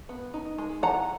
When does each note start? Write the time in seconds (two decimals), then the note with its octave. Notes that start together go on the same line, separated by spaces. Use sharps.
0.09 B3
0.34 D#4
0.58 G#3
0.83 E3 F#5 A#5